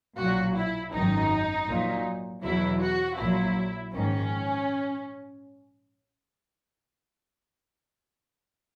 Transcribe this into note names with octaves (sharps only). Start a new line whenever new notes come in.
B1 A#2 F#3 F#4
E4
G#1 F#2 D#3 F#3 D#4
A#1 A#2 F#3
E2 B2 F#3 E4
F#4
A#1 A#2 F#3 E4
A#1 G#2 D#3 C#4